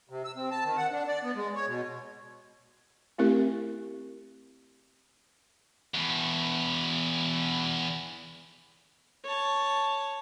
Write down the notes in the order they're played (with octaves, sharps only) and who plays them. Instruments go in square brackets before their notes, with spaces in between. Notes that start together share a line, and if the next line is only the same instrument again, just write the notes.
[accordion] C3
E6
C4
A5
D#3
F#5
D4
D5
B3
G#3
C#5
B2
[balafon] A3 C4 E4 G4 A#4
[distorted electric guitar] E2 B2
[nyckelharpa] C#5 A5